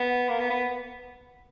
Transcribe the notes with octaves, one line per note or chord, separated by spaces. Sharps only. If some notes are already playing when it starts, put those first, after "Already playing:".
Already playing: B3
A#3
B3
B3